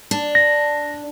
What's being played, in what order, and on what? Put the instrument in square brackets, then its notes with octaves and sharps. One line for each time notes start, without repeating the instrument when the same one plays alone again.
[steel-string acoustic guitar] D4
[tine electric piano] A#6